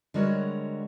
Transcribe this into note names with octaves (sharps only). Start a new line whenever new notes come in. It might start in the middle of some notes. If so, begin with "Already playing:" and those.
D3 G3 G#3 F#4 A#4 C#5